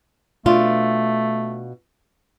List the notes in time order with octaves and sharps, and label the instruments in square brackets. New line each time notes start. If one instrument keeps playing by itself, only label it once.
[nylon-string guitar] B2 D4 F4 [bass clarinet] A3